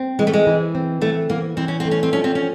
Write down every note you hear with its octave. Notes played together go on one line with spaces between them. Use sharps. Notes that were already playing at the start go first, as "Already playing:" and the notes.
Already playing: C4
E3 G#3
A3
G#3
E3
C4
E3 A3
E3 A#3
E3 C4
C#4
C4
A3
C#4
C4
F3 C#4
C4
C#4